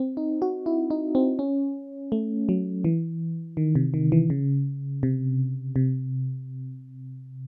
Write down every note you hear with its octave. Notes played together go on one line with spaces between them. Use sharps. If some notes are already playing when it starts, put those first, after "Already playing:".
Already playing: C4
D#4
F#4
E4
D#4
C4
C#4
A3
F#3
E3
D#3
C3
D#3
E3
C#3
C3
C3